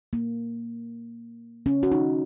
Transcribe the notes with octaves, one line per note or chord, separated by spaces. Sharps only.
A#3
C#4
F#4
D#4